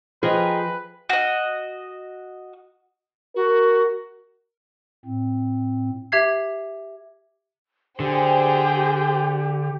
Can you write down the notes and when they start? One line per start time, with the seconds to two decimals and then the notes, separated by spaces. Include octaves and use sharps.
0.23 F3 G#4 B4 D#5 G5 A#5
1.09 F#4 D#5
3.36 F#4 A#4
5.05 A2 C4
6.12 G4 E5 G#6 C7
8.00 D3 G4 G#4 C5 G5